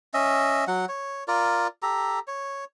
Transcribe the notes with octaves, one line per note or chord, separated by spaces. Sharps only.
C#4 D#5 E5
F#3 F#5
C#5
F4 A#4 D5
G4 A4 A#5
C#5